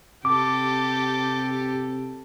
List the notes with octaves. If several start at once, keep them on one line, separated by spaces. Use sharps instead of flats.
C3 G4 A4 D6